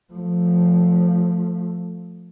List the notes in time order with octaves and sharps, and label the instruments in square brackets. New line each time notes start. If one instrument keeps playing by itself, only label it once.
[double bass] F3 A3